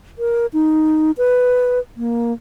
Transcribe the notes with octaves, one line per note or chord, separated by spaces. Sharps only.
A#4
D#4
B4
A#3